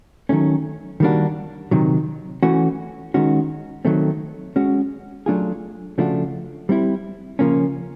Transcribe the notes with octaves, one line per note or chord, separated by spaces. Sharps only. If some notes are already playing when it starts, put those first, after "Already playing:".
D#3 F#3 A3 C#4
D#3 G3 A#3 D4 F#4
C3 D#3 F#3
E3 A3 C#4 F#4
D#3 G#3 C#4 F#4
D#3 F#3 A3 C4
G#3 C#4 F#4
F#3 A3 D4 F4 G#4
C#3 F3 A3 D4 F#4
G3 C4 E4
C#3 F3 A#3 C#4